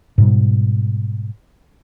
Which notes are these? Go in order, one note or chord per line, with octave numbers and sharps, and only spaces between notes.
G#2 B2 G3